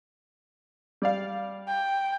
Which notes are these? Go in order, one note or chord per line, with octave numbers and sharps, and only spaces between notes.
G3 D5 F5
G5